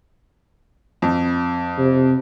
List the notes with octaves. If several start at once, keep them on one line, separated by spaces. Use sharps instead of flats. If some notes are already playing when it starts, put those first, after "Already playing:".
F2
C3